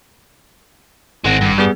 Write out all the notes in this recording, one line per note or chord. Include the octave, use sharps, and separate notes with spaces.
G#1 G#3 C4 F#5 A#6
G2
G3 B3 G#4